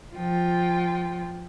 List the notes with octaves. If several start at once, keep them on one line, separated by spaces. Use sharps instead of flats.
F3 F4 G5